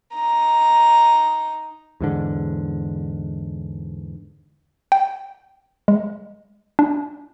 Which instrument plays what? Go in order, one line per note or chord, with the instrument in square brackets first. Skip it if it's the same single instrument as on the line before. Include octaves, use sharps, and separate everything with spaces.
[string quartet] D#4 A#5
[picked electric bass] E2 G#2 D3
[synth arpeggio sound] G5
G#3
D4